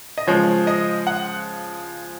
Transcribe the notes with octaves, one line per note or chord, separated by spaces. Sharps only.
D#5
C#3 F3 G#3 C#5
D#5
F#5